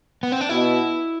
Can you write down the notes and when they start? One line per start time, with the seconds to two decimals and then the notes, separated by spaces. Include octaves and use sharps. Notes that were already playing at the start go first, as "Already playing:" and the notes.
0.23 B3
0.32 C4
0.41 D4
0.49 B2 E4